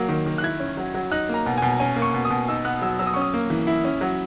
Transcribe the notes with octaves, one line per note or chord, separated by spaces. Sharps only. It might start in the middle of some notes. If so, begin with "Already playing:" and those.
Already playing: F#3 A#3
D#3
D#3
F#6
E4 G#6
C#4
F#3
F#3
D#4 F#6
A#3 A#5
B2
B2 G#5
C#4 G#5
A#3
C#6
B2
D#6
B2
D#4 E6
B3 F#6
F#3 E6
F#3 E6
D#6
C#4 C#6
D#6
A#3
E3
E4
C#4
F#3